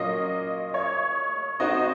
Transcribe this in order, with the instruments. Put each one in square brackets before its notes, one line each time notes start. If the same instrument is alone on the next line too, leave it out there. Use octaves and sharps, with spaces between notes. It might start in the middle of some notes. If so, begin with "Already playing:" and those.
Already playing: [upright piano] A#2 F#3 A#3 C#4 F4 [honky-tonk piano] D#5
[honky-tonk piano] C#5
[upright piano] C4 D#4 F#4 C5 [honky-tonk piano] D#5